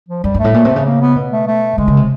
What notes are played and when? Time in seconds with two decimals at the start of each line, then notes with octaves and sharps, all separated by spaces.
0.09 F3
0.24 F#2 G3
0.34 G2 A3
0.44 A2
0.54 A#2
0.65 C3
0.76 C#3
0.85 A#3
1.01 B3
1.16 B2
1.32 A3
1.47 A3
1.78 D3 G#3
1.88 C#3
1.97 C3